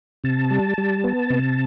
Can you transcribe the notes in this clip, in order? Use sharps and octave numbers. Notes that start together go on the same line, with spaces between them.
C3 A5
G3
G3
B3
C3